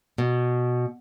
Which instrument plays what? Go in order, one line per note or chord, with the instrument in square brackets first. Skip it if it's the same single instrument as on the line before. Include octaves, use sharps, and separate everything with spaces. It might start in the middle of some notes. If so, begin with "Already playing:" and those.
[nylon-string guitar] B2